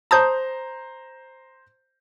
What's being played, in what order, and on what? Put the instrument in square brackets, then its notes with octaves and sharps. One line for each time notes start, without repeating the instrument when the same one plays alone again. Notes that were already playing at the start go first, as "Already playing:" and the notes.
[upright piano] C5 A#5 [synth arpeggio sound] A5 D#6 G6